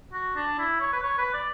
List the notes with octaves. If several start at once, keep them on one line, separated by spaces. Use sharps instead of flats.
F#4
D4
E4
C#5
B4
C#5
B4
D5